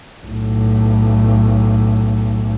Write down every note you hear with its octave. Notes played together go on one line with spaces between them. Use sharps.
B1 A2